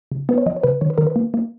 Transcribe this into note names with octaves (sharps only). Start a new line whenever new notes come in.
C#3
B3 B4
C#5
F3 D#5
C#5
C#3 B4
D#3 C#5
B4
D#3 A#4
B4
A#3
A#3